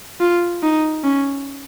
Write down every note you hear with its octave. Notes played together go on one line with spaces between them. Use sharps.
F4
D#4
C#4